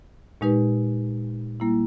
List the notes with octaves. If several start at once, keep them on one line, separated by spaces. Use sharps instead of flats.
A#2 G#3 D#4 G4 B4
G3 A#3 E4